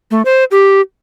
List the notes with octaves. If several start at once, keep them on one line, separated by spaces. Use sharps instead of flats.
A3
C5
G4